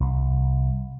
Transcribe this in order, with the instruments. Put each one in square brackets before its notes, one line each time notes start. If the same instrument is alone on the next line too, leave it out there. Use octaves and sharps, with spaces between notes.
[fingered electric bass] C2